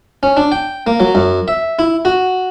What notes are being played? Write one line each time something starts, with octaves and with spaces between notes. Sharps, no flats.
C#4
D4
G5
A#3
F#3
F#2
E5
E4
F#4